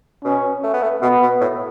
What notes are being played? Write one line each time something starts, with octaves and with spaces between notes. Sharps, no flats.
B2 C#4
A3
B3
A3
B2 B3
B2
A2